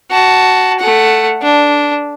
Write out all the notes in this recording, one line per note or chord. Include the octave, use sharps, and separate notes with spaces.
F#4 A5
A3 F#5
D4